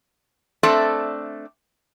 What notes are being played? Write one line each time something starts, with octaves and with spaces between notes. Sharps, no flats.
A3 C4 D4 A4 E5